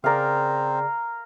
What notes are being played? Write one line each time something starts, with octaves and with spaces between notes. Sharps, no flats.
C#3 C4 G#4 A#4 D5 F5